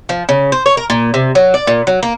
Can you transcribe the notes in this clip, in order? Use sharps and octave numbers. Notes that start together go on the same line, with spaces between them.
F3
C#3
C5
C#5
A#4
A#2
C3
F#3
D5
A#2
F#3
A#3